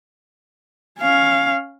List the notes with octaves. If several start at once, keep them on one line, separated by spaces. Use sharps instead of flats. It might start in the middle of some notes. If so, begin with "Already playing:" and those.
C#4 F5